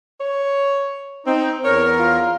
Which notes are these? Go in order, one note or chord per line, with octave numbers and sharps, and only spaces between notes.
C#5
C4 D#4
E2 A#4 C#5
F4